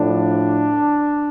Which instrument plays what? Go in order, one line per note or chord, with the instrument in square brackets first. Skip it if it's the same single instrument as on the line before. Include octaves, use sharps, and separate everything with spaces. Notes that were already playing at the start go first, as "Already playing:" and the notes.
Already playing: [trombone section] A2 F3 D4